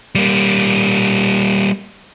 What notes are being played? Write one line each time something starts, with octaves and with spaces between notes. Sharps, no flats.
G3 A#3